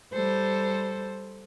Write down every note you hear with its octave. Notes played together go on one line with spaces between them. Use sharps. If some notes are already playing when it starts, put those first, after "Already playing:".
G3 A4 C5